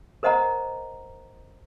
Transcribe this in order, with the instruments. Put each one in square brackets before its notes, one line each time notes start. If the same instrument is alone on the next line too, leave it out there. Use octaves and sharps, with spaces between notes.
[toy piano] A#4 C5 D#5 F#5 A#5